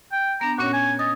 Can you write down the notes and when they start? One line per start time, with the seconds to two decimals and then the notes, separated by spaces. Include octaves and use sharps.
0.12 G5
0.41 B3 D4 A#5
0.58 A#2 C#4 F#4 C#5
0.73 G#5
0.99 D#5 A6